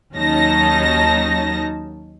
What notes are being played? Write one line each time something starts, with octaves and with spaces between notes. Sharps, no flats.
D#2 F#3 C#4 D#4 A5 A#6